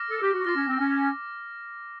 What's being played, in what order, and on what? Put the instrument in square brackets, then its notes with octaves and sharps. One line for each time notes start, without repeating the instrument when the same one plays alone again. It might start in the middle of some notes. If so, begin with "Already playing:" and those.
Already playing: [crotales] D6 F6 A#6
[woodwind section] A4
G4
F#4
[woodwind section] F4 [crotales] D6 F6 A#6
[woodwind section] C#4
C4
C#4